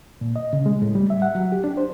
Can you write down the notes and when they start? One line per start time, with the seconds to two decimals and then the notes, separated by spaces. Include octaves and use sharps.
0.21 A#2
0.36 D#5
0.53 C#3
0.66 G#3
0.82 A2
0.95 G3
1.10 E5
1.22 F#5
1.35 F#3
1.52 G4
1.64 D4
1.77 C5